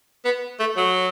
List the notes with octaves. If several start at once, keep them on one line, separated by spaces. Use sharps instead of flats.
B3
A3
F#3